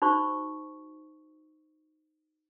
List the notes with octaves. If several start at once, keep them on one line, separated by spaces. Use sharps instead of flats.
D#4 F#4 C5 C#6